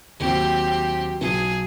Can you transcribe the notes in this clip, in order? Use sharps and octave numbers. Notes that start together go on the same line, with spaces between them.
D#2 F#3 C4 G4
B1 G#4